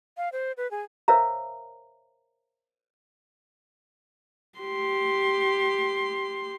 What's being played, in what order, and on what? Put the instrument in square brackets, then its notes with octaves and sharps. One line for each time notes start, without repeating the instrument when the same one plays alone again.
[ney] F5
C5
B4
G#4
[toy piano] A#4 C5 C#5 E5 F5 A#5
[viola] G4 C6